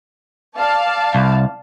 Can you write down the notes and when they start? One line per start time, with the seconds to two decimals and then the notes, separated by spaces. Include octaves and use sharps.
0.57 D5 F5 A5
1.15 C2